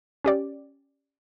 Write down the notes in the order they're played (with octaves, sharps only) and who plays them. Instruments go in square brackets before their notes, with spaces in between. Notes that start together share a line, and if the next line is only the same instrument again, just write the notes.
[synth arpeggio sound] C#4 G4 D5